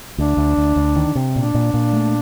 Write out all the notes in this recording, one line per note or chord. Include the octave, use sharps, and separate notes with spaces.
D2 D4
D2
D2
D2
D#3
C3
A#2 D4
A#2
A#2
A3